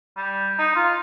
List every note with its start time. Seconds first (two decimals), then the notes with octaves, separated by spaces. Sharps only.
0.17 G3
0.58 D#4
0.76 F4